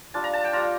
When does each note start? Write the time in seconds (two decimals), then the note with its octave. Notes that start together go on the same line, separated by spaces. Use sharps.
0.14 G3 D4 F4 A5
0.24 A#5
0.33 A5
0.44 G5
0.53 G3 D4 F4 A#5